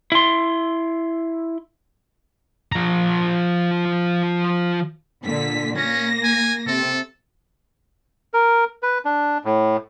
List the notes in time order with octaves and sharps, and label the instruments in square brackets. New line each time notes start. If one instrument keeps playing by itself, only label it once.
[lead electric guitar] E4 C6
[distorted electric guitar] F3 A#5
[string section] A#2 D3 B6
[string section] A#3 A#6 [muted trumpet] C#4
[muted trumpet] G#5
[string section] C3 [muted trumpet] A4
[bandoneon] A#4
B4
D4
A2